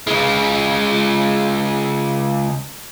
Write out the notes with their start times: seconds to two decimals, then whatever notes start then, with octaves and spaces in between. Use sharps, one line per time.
0.07 C#3 G#3